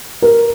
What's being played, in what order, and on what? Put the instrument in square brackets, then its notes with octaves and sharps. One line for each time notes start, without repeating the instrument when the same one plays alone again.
[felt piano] A#4